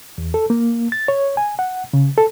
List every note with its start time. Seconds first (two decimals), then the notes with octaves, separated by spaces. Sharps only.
0.18 E2
0.34 A4
0.50 A#3
0.92 A6
1.08 C#5
1.37 G#5
1.59 F#5
1.93 C#3
2.18 A4